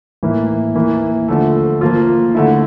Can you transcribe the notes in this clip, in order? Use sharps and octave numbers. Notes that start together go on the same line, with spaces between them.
A2 E3 A#3 E4
E3 A#3 E4
D3 F3 A3
F3 A#3 F4
D3 A3 E4